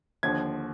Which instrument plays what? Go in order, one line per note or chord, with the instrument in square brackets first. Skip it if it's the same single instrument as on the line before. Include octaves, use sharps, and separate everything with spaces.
[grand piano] D#2 D3 F3 G#6